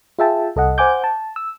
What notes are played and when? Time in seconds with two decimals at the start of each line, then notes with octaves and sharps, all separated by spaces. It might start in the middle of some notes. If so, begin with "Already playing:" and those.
0.19 F4 G#4 E5 G5 A5
0.56 C2 A4 D#5 F#5
0.78 C5 F#5 G#5 D6 G6
1.04 A5
1.36 E6